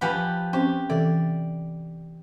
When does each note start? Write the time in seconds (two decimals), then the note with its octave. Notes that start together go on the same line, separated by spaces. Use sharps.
0.01 F3 G4 B4 F#5 G#5 B5
0.53 C4 C#4 G4 C5
0.90 C3 E3 A4 D5